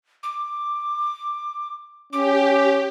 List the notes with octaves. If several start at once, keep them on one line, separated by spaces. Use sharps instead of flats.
D6
C#4 G4 D6